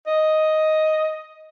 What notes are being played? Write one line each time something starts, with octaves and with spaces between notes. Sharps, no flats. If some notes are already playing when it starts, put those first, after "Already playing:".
D#5